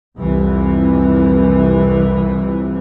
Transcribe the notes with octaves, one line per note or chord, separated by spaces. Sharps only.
C2 F2 C3 E3